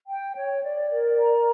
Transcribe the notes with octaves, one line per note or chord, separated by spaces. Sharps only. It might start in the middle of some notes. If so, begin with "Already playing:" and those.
G5
C#5
D5
A#4
A#5